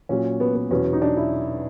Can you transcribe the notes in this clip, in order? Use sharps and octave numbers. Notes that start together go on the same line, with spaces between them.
A#2 F#3 C#4
B3
B3
E2 B2 F#3 C#4
D#4
D4
E4